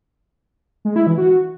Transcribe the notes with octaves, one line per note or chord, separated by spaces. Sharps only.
G#3
E4
E3
F#4